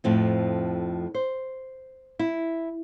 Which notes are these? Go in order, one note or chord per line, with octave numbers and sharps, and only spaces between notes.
F2 A2 F3 C4
C5
E4